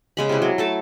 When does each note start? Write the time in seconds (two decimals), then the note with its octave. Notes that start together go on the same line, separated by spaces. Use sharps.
0.17 C#3 G#3 B5
0.29 C3 E4
0.42 F#3
0.58 A3 A4 A5